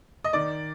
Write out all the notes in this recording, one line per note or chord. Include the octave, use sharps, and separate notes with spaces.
D#5
D#3 D5